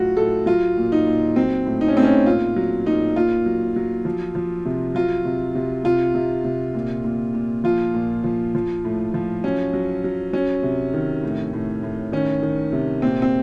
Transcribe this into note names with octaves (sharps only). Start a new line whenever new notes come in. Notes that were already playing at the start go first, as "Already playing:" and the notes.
Already playing: A2 F#3 F4 F#4
A2 A4
F#3 F4
A#2
D#4
A#2
F#3 C4
A2
D#4
C#4
A2 C4
C#4
A#2 F4
F#3
A#2 D#4
A#2 F4
F#3
F#3
F3
F3
C3
F#3 F4
C3
C3
C3 F4
C3
C3
A#2
A#2
A#2
F3 F4
A#2
F3
F3
A2
F3
F#3 C#4
F#3
F#3
F#3 C#4
C3
D#3
A2
A2
A2
D#3 C#4
D#3
C3
A#2 C4
C4